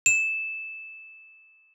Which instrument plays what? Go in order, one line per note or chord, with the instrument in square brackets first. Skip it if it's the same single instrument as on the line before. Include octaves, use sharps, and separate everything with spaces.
[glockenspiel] E7